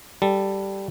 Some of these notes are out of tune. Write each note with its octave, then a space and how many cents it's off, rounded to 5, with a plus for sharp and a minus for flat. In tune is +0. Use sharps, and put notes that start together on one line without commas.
G3 +0 A4 +5